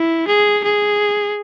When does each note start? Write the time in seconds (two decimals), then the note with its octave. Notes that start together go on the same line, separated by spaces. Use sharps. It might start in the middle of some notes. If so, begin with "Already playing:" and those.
Already playing: E4
0.27 G#4
0.64 G#4